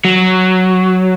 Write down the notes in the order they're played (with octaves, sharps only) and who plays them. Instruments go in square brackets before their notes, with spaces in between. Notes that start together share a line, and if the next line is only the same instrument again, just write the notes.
[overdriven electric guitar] F#3